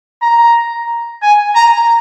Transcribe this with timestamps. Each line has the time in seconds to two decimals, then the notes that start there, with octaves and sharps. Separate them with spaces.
0.22 A#5
1.22 G#5
1.56 A#5